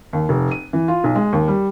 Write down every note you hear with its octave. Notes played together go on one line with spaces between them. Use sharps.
D#2
F1
D#7
E3
F4
B1
G#3
D#2
G3